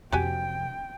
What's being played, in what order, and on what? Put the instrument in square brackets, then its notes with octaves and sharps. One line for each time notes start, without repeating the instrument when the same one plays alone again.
[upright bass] F2 C3 [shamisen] F#4 G4 G#5 [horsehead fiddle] G5